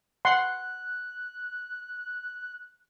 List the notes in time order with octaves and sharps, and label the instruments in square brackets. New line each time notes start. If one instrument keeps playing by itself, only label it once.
[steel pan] F#5 C6 [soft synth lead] F#6